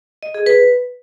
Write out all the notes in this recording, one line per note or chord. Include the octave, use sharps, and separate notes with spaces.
D#5
G#4
B4